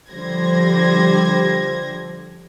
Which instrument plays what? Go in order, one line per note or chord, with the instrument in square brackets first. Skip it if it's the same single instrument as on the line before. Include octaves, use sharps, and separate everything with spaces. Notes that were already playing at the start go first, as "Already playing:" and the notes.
[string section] D3 F3 G3 C5 G#6 A#6